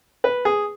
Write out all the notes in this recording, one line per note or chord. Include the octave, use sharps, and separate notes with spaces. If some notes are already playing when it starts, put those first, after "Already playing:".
B4
G#4